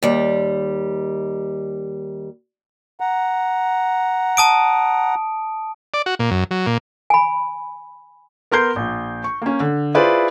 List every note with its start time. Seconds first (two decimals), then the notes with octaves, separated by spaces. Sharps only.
0.02 D#2 G3
3.00 F#5 A#5
4.37 A5 D#6 D7
5.94 D5
6.06 F#4
6.19 A#2
6.31 F#2
6.51 F#3
6.67 A#2
7.10 G#5 B5
8.52 B3 A#4 C6 G6 C7
8.76 A#1
9.24 C#6
9.42 A#3 C#4
9.60 D3
9.94 E4 F4 G#4 B4 C5 D5